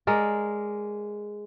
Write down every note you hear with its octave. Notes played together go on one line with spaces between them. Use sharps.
G#3 A#4 D5